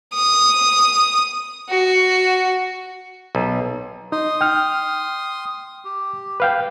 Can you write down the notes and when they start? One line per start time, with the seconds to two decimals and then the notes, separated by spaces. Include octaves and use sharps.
0.14 D#6
1.70 F#4
3.35 B1
4.12 D#4 C6 D#6
4.41 G5 F6
5.85 G4
6.40 B4 F5 G5